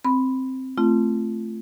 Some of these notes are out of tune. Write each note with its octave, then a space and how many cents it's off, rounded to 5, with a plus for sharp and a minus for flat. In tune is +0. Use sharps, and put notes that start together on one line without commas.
C4 +0 B5 +0
A3 +0 C4 +5 F4 -25